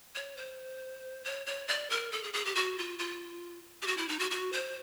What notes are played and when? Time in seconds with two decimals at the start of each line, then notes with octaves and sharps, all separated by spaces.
0.15 C#5
0.37 C5
1.24 C#5
1.46 C#5
1.68 D5
1.90 A#4
2.12 A4
2.23 G#4
2.33 G#4
2.45 G4
2.55 F#4
2.78 F4
2.99 F4
3.82 G4
3.87 F#4
3.97 E4
4.08 D#4
4.19 F#4
4.31 F#4
4.53 C5